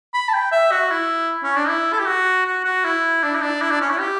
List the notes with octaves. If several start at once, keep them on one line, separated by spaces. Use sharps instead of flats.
B5
A5
G5
E5
F#4
E4
C#4
D4
E4
A4
G4
F#4
F#4
F#4
E4
D4
E4
D4
E4
D4
C#4
E4
G4